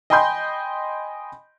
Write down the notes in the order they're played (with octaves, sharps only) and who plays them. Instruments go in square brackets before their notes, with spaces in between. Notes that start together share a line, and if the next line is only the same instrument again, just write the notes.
[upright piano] D#5 G5 G#5 B5 C6 G6